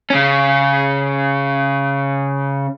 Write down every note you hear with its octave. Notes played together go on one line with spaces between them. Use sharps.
C#3 C#4